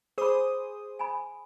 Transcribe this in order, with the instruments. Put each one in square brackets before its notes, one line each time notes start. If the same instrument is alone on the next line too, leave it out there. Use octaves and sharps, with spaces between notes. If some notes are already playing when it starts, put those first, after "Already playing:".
[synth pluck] G#4 C5 D#6 [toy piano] B5 D6
[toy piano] G#5 B5